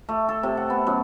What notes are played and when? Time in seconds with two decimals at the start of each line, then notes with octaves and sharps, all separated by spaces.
0.09 A3
0.29 A4
0.43 C3
0.57 F#5
0.70 B3
0.87 F#2